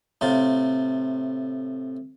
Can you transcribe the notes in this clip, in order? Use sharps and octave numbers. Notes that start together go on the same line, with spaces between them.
A2 C3 F4